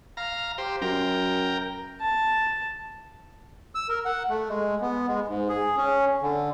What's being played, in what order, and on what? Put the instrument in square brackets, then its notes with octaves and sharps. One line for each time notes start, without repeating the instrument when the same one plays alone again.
[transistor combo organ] F5 A#5
G4 C5
[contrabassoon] F#2 [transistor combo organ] A#4 G5
[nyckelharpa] A5
[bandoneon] E6
A#4
F#5
A3
G#3
B3
G#3
G#2
G#4
C#4
D3